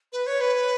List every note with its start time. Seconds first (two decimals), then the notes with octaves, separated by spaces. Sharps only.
0.12 B4
0.27 C#5
0.41 B4